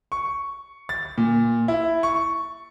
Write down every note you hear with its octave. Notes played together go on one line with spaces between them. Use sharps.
C#6
A6
A#2
E4
C#6